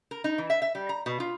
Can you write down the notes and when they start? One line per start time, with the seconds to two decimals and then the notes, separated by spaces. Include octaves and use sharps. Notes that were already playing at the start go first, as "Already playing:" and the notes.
0.11 A#4
0.24 D#4
0.38 E3
0.50 E5
0.62 E5
0.75 G3
0.89 A#5
1.06 B2
1.20 F4